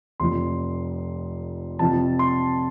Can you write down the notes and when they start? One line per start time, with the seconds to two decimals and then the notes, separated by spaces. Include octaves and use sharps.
0.20 F1 F2 F3 C6
1.79 F2 C3 F3 A5
2.19 C6